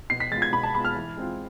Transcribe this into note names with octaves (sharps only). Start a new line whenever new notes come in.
B2 C7
B6
G#3 B3 F4 A6
G#6
B2 B5
A5
G#3 B3 F4 B5
F6
E3
G#3 C4 F4